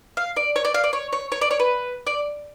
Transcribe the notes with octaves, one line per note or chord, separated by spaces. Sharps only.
F5
D5
C#5
D5
F5
D5
C#5
C#5
C#5
D5
C#5
B4
D5